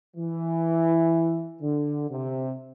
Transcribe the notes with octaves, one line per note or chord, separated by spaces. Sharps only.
E3
D3
C3